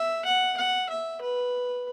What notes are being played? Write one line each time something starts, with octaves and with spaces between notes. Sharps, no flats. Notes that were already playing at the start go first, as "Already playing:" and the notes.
Already playing: E5
F#5
F#5
E5
B4